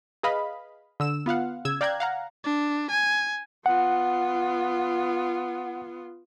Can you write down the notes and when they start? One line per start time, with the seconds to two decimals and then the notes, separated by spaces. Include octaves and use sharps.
0.23 G#4 B4 D#5 F5 B5
1.00 D3 E6 E7
1.26 B3 F4 F5 F#5
1.65 C#3 E6 G#6
1.81 D5 F5 G5 A#5 F#6 G#6
2.00 F5 F#5 A#5
2.44 D4
2.91 G#5
3.66 B3 F4 F#5